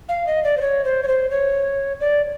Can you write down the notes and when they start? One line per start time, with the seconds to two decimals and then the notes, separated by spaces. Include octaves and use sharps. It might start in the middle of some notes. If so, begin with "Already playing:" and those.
0.09 F5
0.27 D#5
0.44 D5
0.57 C5
0.61 C#5
0.84 C5
1.03 C#5
1.08 C5
1.30 C#5
2.00 D5